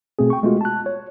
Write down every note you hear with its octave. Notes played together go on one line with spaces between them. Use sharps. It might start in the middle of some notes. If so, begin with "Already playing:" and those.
B2 A3 C4 G#4
G5 C#6
G#3 A3 B3 F4 F#4
A5 F#6
C#5